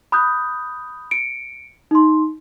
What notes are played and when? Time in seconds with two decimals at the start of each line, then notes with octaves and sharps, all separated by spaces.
0.12 B5 D#6 F#6 G6
1.11 C#7 D7
1.91 D#4 C6